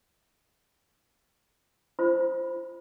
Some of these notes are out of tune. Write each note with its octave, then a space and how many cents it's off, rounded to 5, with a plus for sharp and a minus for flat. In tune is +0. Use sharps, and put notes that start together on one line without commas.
F4 -35 C5 +0 B5 +0